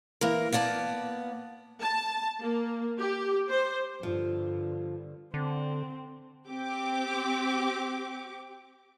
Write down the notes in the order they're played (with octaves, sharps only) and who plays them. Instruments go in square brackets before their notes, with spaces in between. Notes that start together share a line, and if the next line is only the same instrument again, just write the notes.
[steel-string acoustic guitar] E3 A#3 A#4
A#3 B3 D5 A5
[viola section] A5
A#3
G4
C5
[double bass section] G2 D3 [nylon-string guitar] F3
[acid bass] D3 [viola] C4
[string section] C4 G4 D6